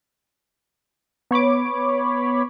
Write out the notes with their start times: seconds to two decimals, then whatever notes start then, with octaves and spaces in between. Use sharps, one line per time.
1.31 B3 C#5 B5 D6